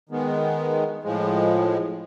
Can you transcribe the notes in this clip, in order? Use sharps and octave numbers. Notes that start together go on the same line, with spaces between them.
D#3 G#3 B3
A2 F3 G#3